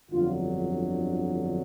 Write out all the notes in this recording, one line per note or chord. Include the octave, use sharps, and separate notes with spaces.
G1 F2 D3 F#3 F4